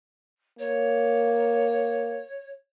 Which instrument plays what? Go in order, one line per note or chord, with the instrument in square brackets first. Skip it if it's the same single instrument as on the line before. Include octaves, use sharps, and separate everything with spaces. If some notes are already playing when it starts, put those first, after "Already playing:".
[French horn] A#3 [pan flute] C#5